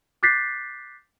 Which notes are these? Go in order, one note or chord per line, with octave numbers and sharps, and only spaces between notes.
D6 F#6 G6 A6 B6 C7